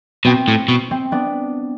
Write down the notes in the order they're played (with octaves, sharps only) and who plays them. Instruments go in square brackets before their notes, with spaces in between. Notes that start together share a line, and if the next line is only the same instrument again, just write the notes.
[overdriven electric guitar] B2 [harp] C4
[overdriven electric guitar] A2
B2
[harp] C4
B3 D4